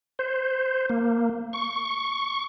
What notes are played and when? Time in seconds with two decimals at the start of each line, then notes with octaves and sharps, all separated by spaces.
0.19 C5
0.89 A#3
1.53 C#6